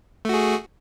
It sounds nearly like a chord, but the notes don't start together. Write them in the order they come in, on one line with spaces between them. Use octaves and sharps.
A3 F#4 G#4